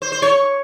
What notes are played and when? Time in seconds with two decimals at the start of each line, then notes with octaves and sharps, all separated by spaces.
0.02 C5
0.12 C5
0.22 C#5